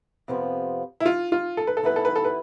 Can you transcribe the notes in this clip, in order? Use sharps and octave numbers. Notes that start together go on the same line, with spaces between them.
F2 C3 F3 B3
E4
F4
F4
A4
B4
A4
G2 E3 B3 E4 B4
A4
B4
A4
B4